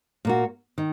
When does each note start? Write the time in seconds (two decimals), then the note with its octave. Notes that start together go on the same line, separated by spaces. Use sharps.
0.25 A#2 A#3 F#4
0.78 D#3